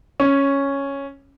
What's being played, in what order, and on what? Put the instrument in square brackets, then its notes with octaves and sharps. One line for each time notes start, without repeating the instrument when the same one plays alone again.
[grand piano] C#4